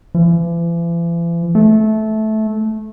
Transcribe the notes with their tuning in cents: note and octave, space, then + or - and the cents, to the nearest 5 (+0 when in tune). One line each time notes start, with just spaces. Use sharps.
E3 +45
A3 -15